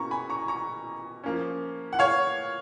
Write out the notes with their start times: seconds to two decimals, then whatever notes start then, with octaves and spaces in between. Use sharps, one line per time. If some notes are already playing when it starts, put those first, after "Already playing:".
Already playing: B2 A#3 C#4 A#5 C#6
0.11 G#5 B5
0.30 A#5 C#6
0.48 A#5 C#6
1.24 F3 A#3 C#4
1.93 F#5
1.99 C#5 F5